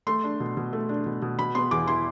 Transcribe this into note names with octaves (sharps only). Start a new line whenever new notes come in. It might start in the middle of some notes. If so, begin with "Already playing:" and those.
A3 C6
D4
B2
B2
A3
D4
B2
B2
B2 B5
B3 C6
E2 D6
E4 C6